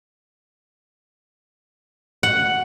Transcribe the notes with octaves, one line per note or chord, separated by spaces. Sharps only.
F#5